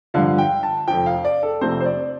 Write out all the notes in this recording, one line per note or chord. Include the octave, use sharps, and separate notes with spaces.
G2 D3 F3 F5
G5
A5
F1 F2 F3 G5
F5
D5
A4
F1 F2 C3 A3 C4 C5
C5
D5